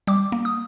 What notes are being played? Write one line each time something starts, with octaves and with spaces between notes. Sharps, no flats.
G3 D6
A#3
D#6